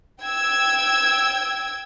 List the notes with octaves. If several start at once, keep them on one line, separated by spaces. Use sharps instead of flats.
G5 E6 G#6